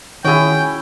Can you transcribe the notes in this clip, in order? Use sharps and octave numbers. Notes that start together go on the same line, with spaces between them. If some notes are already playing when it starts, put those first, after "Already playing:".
D#3 C#4 E4 F#4 G#4 G5